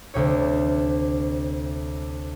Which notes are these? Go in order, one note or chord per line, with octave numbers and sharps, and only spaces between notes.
D2 C3 C#5